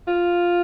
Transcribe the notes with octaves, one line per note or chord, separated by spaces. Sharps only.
F4